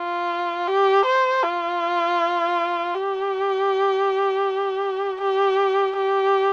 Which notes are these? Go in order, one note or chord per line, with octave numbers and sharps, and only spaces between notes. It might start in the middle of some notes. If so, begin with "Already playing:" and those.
Already playing: F4
G4
C5
F4
G4
G4
G4